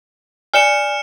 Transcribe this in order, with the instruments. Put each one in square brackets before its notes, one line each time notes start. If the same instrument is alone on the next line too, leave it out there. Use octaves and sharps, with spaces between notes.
[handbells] D5 G#5 [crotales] F6 C#7 E7